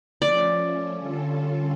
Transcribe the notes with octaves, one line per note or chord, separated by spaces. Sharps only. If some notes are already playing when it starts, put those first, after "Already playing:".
F3 A3 C#4 D5
D3 G3 C#4 F4 A4